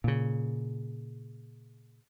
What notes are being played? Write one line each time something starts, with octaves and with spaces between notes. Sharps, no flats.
A#2 C#3